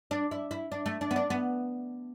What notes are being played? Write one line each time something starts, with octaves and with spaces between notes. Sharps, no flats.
D4
E4
E4
D4
A3
D4
B3
D4
B3